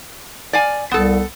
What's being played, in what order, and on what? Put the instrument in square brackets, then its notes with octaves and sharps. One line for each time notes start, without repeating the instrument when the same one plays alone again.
[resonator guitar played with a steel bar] D5 F5 G#5
[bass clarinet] C2 [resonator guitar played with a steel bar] B3 A4